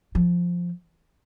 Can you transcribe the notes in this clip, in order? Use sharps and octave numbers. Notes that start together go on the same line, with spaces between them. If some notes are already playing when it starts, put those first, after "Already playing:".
F3